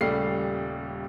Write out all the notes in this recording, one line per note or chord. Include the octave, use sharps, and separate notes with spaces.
D#1 C#3 G3 A3 C7